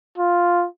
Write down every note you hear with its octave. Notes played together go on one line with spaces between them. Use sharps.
F4